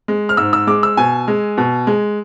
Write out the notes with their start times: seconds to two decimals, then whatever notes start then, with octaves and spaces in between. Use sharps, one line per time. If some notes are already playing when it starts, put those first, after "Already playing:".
0.08 G#3
0.29 F6
0.37 G#2 E6
0.53 E6
0.67 G#3 D6
0.83 E6
0.97 B2 G#5
1.28 G#3
1.58 B2
1.87 G#3